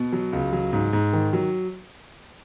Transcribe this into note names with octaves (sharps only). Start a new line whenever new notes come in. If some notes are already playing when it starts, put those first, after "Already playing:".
Already playing: B2
F#3
C#2
F#3
G#2
G#2
D#3
F#3